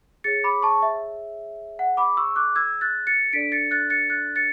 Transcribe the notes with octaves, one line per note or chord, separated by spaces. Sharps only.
G#4 C#5 A6 C#7
B5 D6
A5 C#6
E5
F#5
B5 D6
C#6 E6
D6 F#6
E6 G#6
F#6 A6
A6 C#7
D4 A4 D5 B6 D7
A6 C#7
F#6 A6
A6 C#7
F#6 A6
A6 C#7